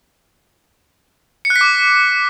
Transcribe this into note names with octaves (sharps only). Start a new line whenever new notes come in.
C#7
F#6
B6
D6